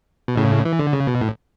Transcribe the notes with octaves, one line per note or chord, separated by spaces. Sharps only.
B2
A2 C#3
E3
D3
C#3
B2
A2